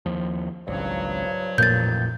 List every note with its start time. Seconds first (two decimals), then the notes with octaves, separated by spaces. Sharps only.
0.06 D#2 F3
0.68 G#1 C#2 G2 F3 F#3
1.58 A1 F2 A#2 G6 A6